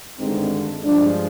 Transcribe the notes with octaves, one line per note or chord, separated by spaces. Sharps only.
G#1 G2 D3 G#3 C4 D#4
G2 F3 G#3 D4